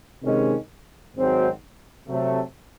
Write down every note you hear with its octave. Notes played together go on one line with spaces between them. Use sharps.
C3 D#3 G#3 C#4
G#1 G#2 F#3 C4 F#4
C3 F#3 A3